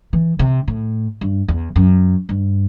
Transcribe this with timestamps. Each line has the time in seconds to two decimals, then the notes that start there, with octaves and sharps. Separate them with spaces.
0.13 E3
0.39 C3
0.68 A2
1.21 G2
1.48 E2
1.76 F#2
2.29 G2